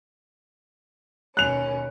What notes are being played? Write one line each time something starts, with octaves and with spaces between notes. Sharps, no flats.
D#2 B2 C#4 F#6 F7